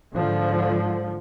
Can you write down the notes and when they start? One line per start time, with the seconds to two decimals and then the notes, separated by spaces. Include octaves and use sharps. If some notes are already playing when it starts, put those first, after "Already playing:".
0.13 G#2 D3 F3